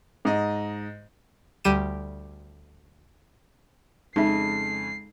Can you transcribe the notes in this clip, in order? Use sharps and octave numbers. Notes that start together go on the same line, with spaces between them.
G#2 D#5
D2 G3 D#7 E7
F2 C#3 G#3 D#4 E5 C7